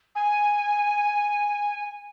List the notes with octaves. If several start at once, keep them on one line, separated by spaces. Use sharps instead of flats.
G#5